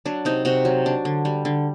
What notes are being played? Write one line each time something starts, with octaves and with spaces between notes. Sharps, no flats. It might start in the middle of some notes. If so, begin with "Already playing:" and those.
F#3 D4
C3 D#4
C3 F#4
F#3
D4
D3
G3
D3